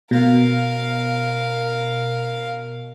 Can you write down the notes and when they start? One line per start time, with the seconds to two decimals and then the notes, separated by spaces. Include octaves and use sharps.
0.11 B2 A#4 F5